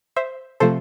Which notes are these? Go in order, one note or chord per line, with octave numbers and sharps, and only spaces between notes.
C5 E5
C3 F3 A3 A4 C5